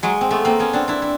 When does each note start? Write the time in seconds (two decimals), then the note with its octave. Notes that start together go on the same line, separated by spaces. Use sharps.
0.03 F#3 G#3
0.21 C4
0.31 A3 B3
0.45 A#3 C4
0.60 B3 C#4
0.73 C4 D4
0.88 D4 E4
1.02 E4